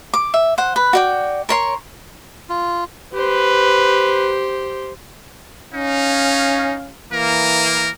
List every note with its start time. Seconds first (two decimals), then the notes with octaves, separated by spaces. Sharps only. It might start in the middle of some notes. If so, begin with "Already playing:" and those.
0.14 D6
0.34 E5
0.58 C5 F#5
0.76 B4
0.93 F#4 D5 G5
1.49 A#4 C#5 C6
2.49 F4
3.13 G4 B4 C5
5.74 C#4 D#4 F5
7.13 E3 A#3 A#4